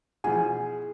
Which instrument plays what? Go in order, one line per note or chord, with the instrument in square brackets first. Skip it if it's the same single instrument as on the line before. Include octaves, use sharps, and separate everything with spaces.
[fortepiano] B2 E3 F3 [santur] G#4 [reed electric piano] G#5